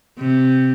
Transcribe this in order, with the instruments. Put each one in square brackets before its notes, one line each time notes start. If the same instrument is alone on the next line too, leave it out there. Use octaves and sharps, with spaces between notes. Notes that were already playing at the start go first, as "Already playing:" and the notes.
[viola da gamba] C3